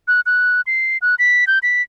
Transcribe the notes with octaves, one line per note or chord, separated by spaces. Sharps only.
F#6
F#6
C7
F#6
B6
G6
B6